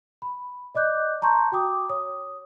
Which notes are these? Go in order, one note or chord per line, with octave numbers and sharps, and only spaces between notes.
B5
D5 D#5 D6 F#6 G6
A5 A#5 C6 C#6 G6
F#4 G5 D6 D#6
C#5 D#6